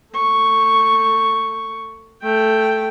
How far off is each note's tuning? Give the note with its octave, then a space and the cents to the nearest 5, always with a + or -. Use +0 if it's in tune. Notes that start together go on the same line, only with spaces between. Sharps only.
A3 +30 C#6 +0
A3 +0 G5 +0